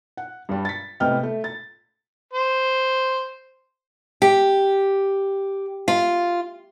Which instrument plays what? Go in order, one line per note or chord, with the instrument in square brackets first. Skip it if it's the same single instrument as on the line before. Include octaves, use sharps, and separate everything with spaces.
[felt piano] F#5
G2 G3
A6 B6
A2 C3 B3 D#5 G5 F6
A3
A6
[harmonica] C5
[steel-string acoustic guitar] G4
F4